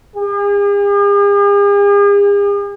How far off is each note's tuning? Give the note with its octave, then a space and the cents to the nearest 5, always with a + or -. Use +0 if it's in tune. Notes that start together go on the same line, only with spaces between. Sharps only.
G#4 -45